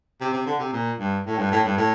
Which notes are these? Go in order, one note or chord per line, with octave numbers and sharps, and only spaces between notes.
C3
C3
D3
C3
A#2
G2
A2
G2
A2
G2
A2